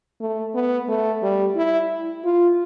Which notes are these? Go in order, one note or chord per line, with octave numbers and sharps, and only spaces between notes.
A3
B3
A3
G3
E4
F4